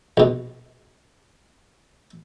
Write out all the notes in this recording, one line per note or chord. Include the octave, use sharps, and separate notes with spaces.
A#1 B2